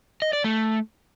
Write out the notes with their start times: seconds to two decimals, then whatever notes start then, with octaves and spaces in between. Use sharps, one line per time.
0.22 D#5
0.33 D5
0.44 A3